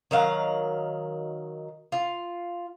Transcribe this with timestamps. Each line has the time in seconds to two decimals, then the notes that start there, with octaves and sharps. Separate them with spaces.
0.11 D#3 F#3 F5 F#5
1.92 F4